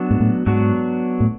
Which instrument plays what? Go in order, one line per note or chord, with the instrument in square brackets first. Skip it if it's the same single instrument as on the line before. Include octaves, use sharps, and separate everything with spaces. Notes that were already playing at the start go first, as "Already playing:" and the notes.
Already playing: [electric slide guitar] F#3 B3 D4 F#4
[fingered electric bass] G#2
A2
[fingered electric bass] G#2 [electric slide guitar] F#3 B3 D4 F#4
[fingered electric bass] A2